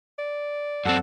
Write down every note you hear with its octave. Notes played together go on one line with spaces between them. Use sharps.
D5
F#2 C4 A4 F#5